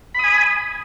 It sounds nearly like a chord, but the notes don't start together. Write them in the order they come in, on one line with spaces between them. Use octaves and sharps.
B5 D#6 G#5